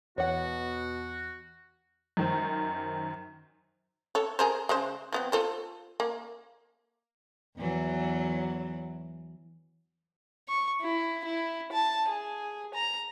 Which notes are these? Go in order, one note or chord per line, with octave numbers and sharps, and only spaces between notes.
E2 B2 F#4 C#5 F#5
F#2 D#3 C5
A4 C#5
G#4 A#4 C5
C#3 G#3 C5
F3 B3 C4
F4 A4 C5
A#3
E2 E3 F#3
C#6
E4
E4
A5
G#4
A#5